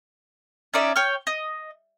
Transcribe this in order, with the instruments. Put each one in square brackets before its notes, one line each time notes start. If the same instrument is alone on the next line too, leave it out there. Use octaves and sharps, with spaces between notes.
[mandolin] C#4 D#4 D5 E5
C#5 G5 F6
D#5